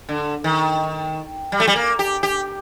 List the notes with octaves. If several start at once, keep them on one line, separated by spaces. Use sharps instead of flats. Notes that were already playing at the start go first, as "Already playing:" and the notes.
D3
D#3
G3
A3
G3
A#3
G4
G4